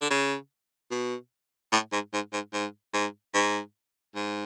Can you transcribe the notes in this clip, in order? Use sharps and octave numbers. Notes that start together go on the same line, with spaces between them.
D3
C#3
B2
A2
G#2
G#2
G#2
G#2
G#2
G#2
G#2